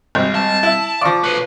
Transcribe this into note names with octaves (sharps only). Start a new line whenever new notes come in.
G#1 G3 C4
A5
E4
F3 D5 F5 C#6 D6
B4 C#5